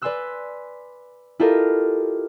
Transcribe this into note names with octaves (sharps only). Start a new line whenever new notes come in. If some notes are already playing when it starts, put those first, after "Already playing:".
B4 D5 G#5 C6 E6 F#6
E4 F4 G4 A4 A#4 D#5